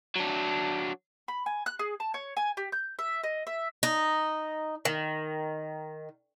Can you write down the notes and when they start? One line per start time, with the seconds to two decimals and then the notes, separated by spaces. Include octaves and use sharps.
0.16 F#3 D4
1.28 B5
1.46 G#5
1.66 F#6
1.79 G#4
2.00 A5
2.14 C#5
2.37 G#5
2.57 G4
2.72 G6
2.99 E5
3.24 D#5
3.47 E5
3.83 D#4
4.85 D#3